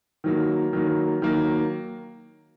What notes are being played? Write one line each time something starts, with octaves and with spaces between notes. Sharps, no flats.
D#3 F#3 A#3
D#3 F#3 A#3
D#3 F#3 A#3